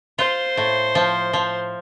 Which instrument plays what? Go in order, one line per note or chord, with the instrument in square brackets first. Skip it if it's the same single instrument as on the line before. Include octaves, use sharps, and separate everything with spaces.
[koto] F4 [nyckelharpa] C5
[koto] A2
F3
F3